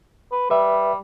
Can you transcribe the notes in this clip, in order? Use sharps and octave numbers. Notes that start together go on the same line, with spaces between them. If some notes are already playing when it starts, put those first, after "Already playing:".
B4
G3 B4 E5